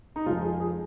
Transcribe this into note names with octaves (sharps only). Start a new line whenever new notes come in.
D#4
F2 F3 G#3 F4
G#4
G#4